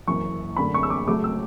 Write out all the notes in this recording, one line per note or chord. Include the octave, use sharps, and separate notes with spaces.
F#1 F#2 E3 C#6
F#2 D3 A3 B5
C#6
E6
D6
C#2 C#3 F#3 A3 D6
E6